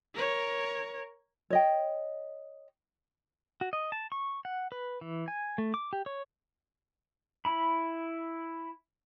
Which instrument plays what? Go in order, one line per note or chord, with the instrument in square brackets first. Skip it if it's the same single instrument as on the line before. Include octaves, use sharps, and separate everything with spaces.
[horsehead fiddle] A#4 C#5
[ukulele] C#5 D#5 G5
[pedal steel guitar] F#4
D#5
A5
C#6
F#5
B4
E3
G#5
A3
D6
G4
C#5
E4 B5